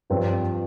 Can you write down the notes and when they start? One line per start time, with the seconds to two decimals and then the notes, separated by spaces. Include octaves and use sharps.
0.10 G2 F3 C4 F4